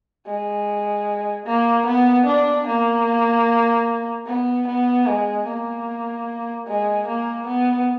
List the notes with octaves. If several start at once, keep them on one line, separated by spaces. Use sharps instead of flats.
G#3
A#3
B3
D4
A#3
B3
B3
G#3
A#3
G#3
A#3
B3